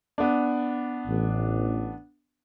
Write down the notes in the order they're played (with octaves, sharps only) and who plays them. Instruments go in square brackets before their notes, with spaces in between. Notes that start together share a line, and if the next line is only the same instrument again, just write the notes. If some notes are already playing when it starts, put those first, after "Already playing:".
[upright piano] B3 D4
[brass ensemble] A1